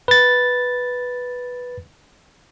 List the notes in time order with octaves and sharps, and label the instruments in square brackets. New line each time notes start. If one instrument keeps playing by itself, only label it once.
[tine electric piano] B4 A6